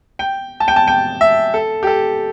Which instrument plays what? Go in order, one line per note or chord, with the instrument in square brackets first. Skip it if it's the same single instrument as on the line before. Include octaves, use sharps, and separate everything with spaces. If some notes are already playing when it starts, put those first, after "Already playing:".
[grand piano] G5
A5
G5
A5
G5
E5
A4
G4
A4